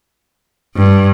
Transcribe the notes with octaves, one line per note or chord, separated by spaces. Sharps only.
G2